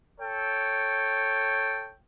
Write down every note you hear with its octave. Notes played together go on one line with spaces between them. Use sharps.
A4 C#5 G5